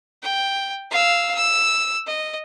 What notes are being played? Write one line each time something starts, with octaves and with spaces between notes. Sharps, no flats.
G5
F5 E6
E6
D#5